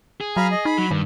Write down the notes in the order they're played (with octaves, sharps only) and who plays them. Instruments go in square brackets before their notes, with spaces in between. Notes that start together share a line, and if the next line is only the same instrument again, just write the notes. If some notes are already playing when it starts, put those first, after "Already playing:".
[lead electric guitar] G#4
[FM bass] F#3 [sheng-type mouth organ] F5 A#5 B5
[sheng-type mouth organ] D#5
[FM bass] D#4 [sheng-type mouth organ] B5
[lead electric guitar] F#3
[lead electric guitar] G2 [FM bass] D#3